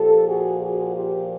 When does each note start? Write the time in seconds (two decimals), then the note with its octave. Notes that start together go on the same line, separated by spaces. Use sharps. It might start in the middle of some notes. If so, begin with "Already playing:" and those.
Already playing: A#2 F3 G4 A4
0.27 F#4 G#4
0.62 F#4 G#4
0.95 F4 G4